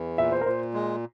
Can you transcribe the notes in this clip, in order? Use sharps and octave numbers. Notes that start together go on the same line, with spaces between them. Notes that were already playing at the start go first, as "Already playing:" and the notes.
Already playing: E2
A#2 E5
C5
A#4
A#2 C5
G#3